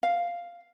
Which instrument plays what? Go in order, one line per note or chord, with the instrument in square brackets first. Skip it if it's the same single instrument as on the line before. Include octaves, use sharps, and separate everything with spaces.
[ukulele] F5